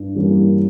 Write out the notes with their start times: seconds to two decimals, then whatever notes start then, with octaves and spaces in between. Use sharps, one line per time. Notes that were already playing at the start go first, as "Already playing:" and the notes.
Already playing: G2
0.15 E3 G3 A#3 C#4